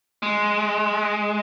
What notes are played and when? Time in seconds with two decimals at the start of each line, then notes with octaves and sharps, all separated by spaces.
0.23 G#3